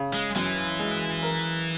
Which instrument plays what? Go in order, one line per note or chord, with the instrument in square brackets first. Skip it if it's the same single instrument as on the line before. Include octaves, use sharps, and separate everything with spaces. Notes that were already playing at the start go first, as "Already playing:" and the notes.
Already playing: [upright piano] C#3
[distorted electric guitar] G#3
[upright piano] F#2 [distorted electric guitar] E3
[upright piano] G#3
A#4